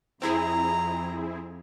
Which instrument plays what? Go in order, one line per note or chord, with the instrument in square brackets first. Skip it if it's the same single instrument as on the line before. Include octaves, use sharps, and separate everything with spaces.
[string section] F2 [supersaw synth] C4 E4 G#4 [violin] A#5